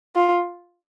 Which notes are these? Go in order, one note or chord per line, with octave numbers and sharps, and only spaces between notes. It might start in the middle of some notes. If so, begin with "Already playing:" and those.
F4